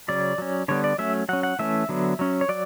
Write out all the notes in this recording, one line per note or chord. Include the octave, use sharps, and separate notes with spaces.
C#3 F#3 C#4 D5
F#3 C#4
D3 G3 B3 C#5
D5
F#3 A3 C#4 E5
F#3 C#4 F#5
F#5
E3 A3 C#4 E5
D3 F#3 B3
F#3 C#4
C#5
F#3 D5